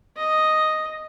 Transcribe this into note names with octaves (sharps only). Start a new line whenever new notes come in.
D#5